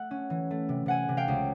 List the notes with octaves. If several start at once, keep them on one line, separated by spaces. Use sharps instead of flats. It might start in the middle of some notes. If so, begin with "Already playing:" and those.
Already playing: A3 F#5
C#4
E3
A3
C3
C3 F#5 G#5
C3
F5 G5
C#2